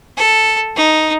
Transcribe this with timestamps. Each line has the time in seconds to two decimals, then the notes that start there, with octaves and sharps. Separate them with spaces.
0.17 A4
0.76 D#4